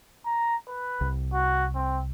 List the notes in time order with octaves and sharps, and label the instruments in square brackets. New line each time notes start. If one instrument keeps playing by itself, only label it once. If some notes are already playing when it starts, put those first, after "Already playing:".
[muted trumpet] A#5
B4
[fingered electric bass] C2
[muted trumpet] F#4
C4